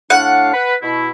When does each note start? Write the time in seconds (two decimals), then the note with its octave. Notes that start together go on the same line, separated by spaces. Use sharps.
0.10 A2 D4 F5 F#5
0.54 B4
0.82 B2 E4